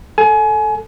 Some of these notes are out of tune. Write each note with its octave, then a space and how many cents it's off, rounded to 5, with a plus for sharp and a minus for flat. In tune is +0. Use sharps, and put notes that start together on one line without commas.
A4 +0 G#5 +30